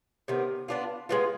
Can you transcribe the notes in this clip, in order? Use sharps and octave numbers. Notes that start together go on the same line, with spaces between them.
C3 D#3 B3
B3 D4 F4
G#3 B3 F4